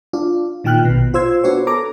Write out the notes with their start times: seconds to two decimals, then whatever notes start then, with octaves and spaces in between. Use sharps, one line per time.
0.13 D4 F4
0.64 A#2 D#3 F4 G5 F6 F#6
0.85 A#1 B2
1.14 F4 C5 E6 G#6
1.44 B3 D4 F#4 C5 C#5
1.67 A4 A#5 D6